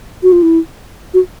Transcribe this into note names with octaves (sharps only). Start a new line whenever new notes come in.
F#4
F4
E4
F#4